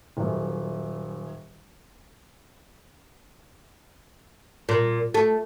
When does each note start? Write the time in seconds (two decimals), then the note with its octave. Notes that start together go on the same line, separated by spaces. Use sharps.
0.17 D#1 F#2
4.69 A#2
5.14 A3